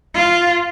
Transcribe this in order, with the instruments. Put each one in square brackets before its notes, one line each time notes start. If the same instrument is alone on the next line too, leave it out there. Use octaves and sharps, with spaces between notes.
[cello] F4